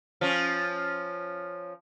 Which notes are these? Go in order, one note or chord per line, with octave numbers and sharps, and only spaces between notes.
F3 C#4